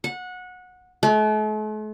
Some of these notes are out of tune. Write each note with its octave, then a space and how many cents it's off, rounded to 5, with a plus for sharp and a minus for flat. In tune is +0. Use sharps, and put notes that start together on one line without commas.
F#5 -20
A3 -45